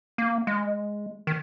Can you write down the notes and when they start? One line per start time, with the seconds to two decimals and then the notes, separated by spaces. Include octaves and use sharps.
0.18 A#3
0.47 G#3
1.27 D#3